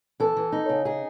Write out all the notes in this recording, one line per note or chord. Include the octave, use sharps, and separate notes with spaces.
E3 A4
E3
D#4
C#3
D#4 G#4